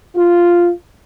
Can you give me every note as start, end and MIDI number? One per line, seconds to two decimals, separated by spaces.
0.15 0.69 65